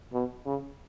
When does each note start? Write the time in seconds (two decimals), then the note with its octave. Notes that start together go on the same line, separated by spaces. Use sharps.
0.13 B2
0.46 C#3